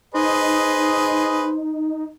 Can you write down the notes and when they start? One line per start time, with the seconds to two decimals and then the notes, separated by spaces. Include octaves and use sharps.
0.14 D#4 G#4 B4 C5 D#5